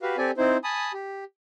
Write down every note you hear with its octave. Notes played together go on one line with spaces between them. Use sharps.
F#4 G4 B4 F5
C4 G4 A4 D5 G#5
C4 D#4 E4 C5
G#5 A5 B5 D#6
G4